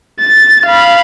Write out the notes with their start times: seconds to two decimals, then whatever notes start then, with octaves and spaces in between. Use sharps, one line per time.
0.20 A6
0.66 F5 B5